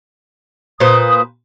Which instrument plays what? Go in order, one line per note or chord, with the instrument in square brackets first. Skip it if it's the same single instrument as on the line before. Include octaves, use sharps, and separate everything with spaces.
[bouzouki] A#2 B4 C5 [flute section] D#6